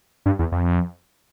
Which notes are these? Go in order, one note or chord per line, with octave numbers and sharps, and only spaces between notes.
G2
E2
F2